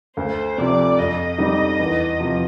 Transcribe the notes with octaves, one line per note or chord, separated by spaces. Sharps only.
D2 C5
C3 F3 D5
F2 D#5
D3 G3 C4 D#4
E2
C3 F3